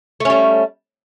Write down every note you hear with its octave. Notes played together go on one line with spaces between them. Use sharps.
G3 A3 C#4